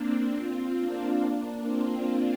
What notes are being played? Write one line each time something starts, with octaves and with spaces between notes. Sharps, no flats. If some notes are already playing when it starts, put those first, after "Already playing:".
Already playing: A#3 C4 D4
C4 F4
A#3 D4
C4 F4